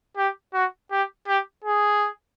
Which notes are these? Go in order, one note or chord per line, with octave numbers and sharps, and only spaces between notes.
G4
F#4
G4
G4
G#4